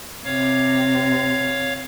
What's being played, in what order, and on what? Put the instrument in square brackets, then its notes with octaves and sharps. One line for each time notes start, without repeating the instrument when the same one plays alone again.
[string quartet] C3 [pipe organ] C#5 F5